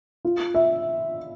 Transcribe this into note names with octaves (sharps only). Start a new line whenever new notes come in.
F4
E5